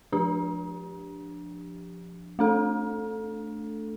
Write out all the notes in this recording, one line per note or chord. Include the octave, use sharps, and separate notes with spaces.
F3 D4 G4
A3 D4 A4